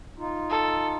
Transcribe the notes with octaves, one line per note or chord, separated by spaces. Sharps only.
D#4 F4
A4